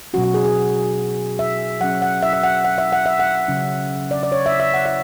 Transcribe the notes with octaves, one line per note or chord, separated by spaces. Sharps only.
B2 F#3 C#4 F#4
F#4
G#4
G#4
E5
F#3 C#4 F#5
F#5
E5
E5
F#5
F#5
E5
F#5
E5
F#5
C#3 F#3 C#4
D5
D5
C#5
E5
E5
F#5
E5